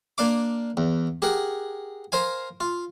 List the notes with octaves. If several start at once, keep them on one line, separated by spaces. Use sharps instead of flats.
A#3 D4 F5 D6
E2
G4 G#4 A#4 F#5
A#4 C5 F5 G#5
F4